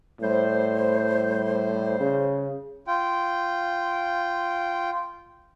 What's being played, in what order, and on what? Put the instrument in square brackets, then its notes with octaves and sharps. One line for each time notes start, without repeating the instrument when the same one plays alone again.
[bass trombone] A2 [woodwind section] G3 C5
[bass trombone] C#3
[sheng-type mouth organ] F4 G5